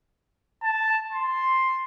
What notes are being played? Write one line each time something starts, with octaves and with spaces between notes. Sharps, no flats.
A5
C6